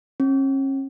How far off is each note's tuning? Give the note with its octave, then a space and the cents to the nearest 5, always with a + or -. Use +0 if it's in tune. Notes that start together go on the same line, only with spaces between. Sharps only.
C#4 -40